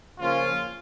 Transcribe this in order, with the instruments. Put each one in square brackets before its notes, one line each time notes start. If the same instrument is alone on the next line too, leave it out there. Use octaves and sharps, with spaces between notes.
[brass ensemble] C#3 F3 A#3 C#4 F4